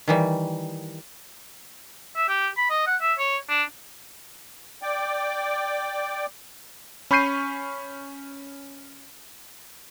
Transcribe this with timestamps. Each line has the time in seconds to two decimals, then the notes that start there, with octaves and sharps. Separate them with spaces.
0.08 D#3 E3 G3
2.16 E5
2.29 G4
2.57 B5
2.70 D#5
2.87 F#5
3.02 E5
3.19 C#5
3.49 D4
4.82 D5 G5 D6
7.11 C#4 B5 C#6 G6 C7 D#7